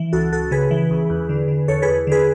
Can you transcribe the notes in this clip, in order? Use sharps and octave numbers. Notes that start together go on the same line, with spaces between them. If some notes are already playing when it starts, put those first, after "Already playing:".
Already playing: E3
C#2 F#4 A4
C#2 F#4 A4
C#3 G#4 B4
E3
C#2
E2
D3
D3
E2 A4 C#5
G#4 B4
E2
D3 G#4 B4